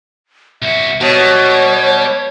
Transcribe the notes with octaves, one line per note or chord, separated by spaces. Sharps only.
C2 F#4 E5
B2 G3 G4 C#5